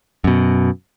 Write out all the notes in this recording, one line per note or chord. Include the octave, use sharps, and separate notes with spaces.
F#2 B2